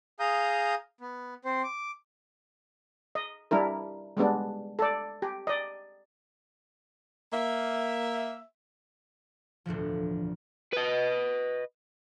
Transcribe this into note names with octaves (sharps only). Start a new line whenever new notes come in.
G#4 F5 A#5 D#6 G6
B3
C4 C5
D6
D#5
G3 D4 E4 A#4
G3 G#3 B3 D4
A4 D5
G4
D5 D#5
A#3 E5
E1 D2 A2 F3
B4 D#5